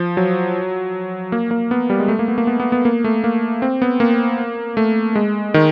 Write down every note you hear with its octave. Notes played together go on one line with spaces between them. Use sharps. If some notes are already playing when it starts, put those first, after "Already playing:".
Already playing: F3
F#3
A#3
A#3
B3
G3
G#3
A3
A#3
B3
A#3
B3
B3
B3
A#3
A3
A#3
C4
B3
A#3
A3
G#3
D#3